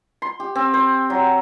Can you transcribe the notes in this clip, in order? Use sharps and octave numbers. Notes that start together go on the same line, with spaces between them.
C6
G4
C4
C5
F#3